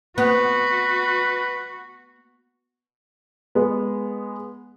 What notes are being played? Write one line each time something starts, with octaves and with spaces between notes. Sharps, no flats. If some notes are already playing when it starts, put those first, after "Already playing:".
B3 F#4 B4
G#3 B3